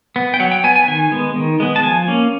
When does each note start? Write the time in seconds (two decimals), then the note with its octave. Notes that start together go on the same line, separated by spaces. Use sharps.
0.16 B3
0.34 G5
0.40 F#3 F#5
0.51 G5
0.64 B3 G#5
0.76 G#5
0.88 D#3 G#5
1.11 G#3 B3
1.36 D#3
1.60 G#3 B3
1.76 A5
1.83 F3 G#5
2.08 A#3 C#4